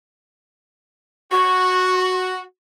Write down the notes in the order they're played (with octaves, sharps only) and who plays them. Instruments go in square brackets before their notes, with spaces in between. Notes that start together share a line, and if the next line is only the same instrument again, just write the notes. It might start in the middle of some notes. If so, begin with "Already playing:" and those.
[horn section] F#4 [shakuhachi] C#6